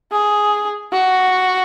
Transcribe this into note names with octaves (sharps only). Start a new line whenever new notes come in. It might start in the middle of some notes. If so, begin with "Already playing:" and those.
G#4
F#4